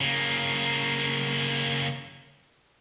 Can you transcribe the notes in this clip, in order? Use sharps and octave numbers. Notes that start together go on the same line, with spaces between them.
C#3 A#3